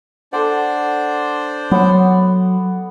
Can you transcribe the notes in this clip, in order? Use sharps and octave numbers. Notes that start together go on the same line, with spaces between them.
D4 A4 C5 D5 F#5
F#3 B3 F#5